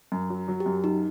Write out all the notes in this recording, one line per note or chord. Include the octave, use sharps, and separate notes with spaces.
F#2
F#3
F#3
G4
F#2
F#3 D#4